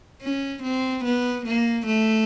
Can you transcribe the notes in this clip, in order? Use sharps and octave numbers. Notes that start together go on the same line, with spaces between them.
C#4
C4
B3
A#3
A3